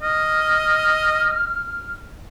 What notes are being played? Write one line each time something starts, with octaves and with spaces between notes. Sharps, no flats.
D#5 F6